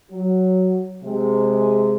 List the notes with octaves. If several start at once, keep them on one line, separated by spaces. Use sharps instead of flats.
F#3
C3 G#3